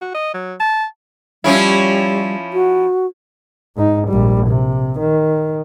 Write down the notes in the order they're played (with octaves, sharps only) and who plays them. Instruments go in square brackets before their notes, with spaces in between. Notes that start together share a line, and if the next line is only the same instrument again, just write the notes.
[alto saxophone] F#4
D#5
F#3
A5
[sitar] F3 C#4 E4 [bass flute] G3
[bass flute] F#4
[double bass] G#2 D#4
A#1 G3
C3
D#3